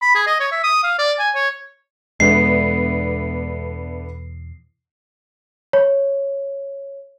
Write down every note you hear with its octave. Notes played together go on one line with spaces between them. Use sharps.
B5
G#4
D#5
C#5
E5
D#6
F5
D5
G#5
C#5
E2 B2 G#3 A3 B3 D4 C7
C#5